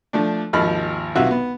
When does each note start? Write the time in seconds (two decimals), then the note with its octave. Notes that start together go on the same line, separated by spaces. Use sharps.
0.13 F3 A3 D4
0.53 G#1 D#2 F3 B5 F6
1.15 B1 C3 F4 F#4 E5 F#5
1.31 B3